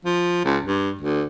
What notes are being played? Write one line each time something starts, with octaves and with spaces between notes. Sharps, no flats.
F3
C#2
G2
D2